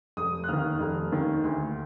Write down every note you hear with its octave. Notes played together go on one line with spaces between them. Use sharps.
F1 D#6
F#6
D#2 D#3 F6
F1
D#2 D#3
D2